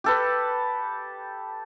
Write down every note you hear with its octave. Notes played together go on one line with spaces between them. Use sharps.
G4 A4 B4